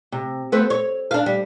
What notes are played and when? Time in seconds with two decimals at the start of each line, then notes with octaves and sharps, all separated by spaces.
0.12 C3
0.52 A3 B3 C4
0.70 C#5
1.11 D4 F5
1.26 G3